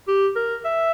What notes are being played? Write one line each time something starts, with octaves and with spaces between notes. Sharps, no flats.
G4
A#4
E5